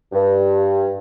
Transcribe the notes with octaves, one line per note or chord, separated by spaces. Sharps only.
G2